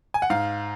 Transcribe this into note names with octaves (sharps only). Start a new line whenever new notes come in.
G#5
F#5
G#2 F5